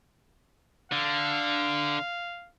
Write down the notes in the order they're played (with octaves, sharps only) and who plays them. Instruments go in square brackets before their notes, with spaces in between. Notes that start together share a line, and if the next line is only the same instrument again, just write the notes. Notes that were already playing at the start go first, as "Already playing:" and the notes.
[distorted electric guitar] D3 [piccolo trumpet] F5